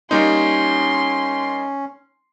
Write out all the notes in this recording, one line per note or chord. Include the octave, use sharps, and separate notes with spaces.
G3 A#3 C#4 D#4 C6